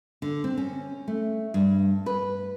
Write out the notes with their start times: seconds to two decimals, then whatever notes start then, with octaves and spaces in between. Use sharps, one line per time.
0.22 D3
0.44 C4
0.57 C#4
1.08 A3
1.54 G2
2.06 B4